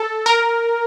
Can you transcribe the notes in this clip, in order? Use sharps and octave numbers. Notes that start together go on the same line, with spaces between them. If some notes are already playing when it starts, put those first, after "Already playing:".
Already playing: A4
A#4